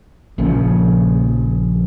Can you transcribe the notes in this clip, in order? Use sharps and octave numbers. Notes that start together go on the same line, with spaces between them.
A#1 A#2 C#3 F3